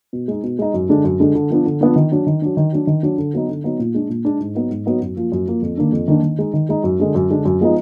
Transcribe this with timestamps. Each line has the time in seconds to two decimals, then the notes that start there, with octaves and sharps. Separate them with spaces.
0.13 B2
0.28 G#3 D#4
0.43 B2
0.59 G#3 D#4
0.74 F#2
0.89 D3 G#3 D4
1.04 F#2
1.20 D3 G#3 D4
1.35 D3
1.50 F3 B3 D4
1.66 D3
1.81 F3 B3 D4
1.96 D#3
2.12 F#3 D4
2.27 D#3
2.42 F#3 D4
2.57 D#3
2.72 F#3 D4
2.87 D#3
3.03 F#3 D4
3.18 D3
3.33 F#3 B3 D#4
3.48 D3
3.64 F#3 B3 D#4
3.79 A#2
3.94 G#3 D4
4.09 A#2
4.25 G#3 D4
4.40 G#2
4.55 F#3 B3 D#4
4.70 G#2
4.86 F#3 B3 D#4
5.01 F#2
5.16 F3 A#3
5.32 F#2
5.47 F3 A#3
5.62 F2
5.78 D#3 A#3 D4
5.92 F2
6.08 D#3 A#3 D4
6.23 D#3
6.39 G#3 D#4
6.54 D#3
6.69 G#3 D#4
6.84 F#2
6.99 D3 G#3 D4
7.15 F#2
7.30 D3 G#3 D4
7.45 F#2
7.61 F3 G#3 B3 D#4